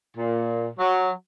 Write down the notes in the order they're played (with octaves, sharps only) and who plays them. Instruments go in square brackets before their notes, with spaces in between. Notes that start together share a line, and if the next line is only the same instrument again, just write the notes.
[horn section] A#2
F#3